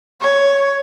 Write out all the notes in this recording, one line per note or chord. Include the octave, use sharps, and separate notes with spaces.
C#5